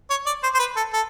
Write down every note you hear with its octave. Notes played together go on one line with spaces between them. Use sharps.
C#5
D5
C5
C5
B4
A4
A4